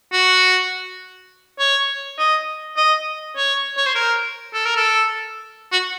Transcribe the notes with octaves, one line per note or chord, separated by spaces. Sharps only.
F#4
C#5
D#5
D#5
C#5
C#5
C5
A#4
A4
A#4
A4
F#4